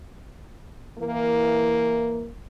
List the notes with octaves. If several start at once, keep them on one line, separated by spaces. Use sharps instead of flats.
E3 A#3